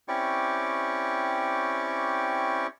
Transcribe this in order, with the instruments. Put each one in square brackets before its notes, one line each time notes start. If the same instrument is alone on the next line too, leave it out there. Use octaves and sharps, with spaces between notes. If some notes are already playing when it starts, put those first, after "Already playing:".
[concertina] C4 C#4 E4 G4 D5 C#6